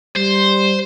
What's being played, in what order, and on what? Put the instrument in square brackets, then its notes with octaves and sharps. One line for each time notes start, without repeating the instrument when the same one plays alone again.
[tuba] G3 [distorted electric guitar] C5